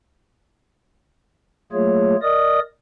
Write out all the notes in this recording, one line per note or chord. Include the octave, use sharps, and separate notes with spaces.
F#3 A3 A#3 F4 G#4 C#5
A#4 D5 D#5 D#6